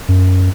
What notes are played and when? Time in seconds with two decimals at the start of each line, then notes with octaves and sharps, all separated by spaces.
0.09 F#2